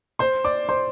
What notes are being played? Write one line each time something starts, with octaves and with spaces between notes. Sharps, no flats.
C5 C6
D5 D6
C5 C6